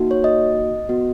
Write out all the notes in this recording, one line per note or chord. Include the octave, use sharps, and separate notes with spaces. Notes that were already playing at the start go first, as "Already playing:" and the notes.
Already playing: A#3 D#4 F#4
C#5
D#5
B3 F#4